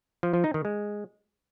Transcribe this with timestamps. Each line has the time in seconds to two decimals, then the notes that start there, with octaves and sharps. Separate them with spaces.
0.23 F3
0.33 F3
0.44 D#4
0.54 D#3
0.65 G#3